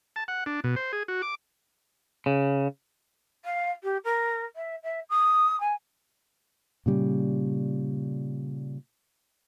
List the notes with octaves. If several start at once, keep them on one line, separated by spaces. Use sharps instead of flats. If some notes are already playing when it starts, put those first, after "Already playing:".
A5
F#5
D4
B2
C5
G#4
F#4
D6
C#3
F5
G4
A#4
E5
E5
D#6
G#5
A#2 C#3 G3